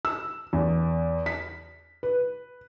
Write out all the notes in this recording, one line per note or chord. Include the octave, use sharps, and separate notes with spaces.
E6
E2
B6
B4